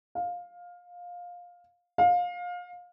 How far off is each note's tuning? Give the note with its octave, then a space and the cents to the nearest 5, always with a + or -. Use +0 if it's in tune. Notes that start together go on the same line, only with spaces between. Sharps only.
F5 +15
F5 +25